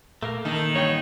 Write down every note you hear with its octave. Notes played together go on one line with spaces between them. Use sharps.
A#2 A3 A#3 A#4
D#3 E3 A#3 D#4 A4
G2 B3 C#5 G5